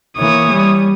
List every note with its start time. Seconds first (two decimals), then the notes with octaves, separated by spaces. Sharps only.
0.18 E3 A#3 C#5 D#6
0.52 G3